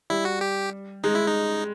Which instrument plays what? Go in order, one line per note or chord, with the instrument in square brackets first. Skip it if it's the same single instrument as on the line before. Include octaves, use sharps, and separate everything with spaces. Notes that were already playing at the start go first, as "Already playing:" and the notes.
[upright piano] G3 [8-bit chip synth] E4
[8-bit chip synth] F#4
G4
[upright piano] G#3 [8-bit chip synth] D#4
[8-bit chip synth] E4
D#4